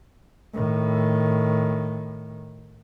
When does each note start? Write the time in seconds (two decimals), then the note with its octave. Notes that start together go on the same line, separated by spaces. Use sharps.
0.53 A2 D#3